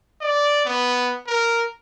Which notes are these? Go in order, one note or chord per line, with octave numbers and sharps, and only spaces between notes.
D5
B3
A#4